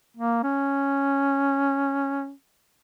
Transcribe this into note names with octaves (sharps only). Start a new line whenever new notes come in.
A#3
C#4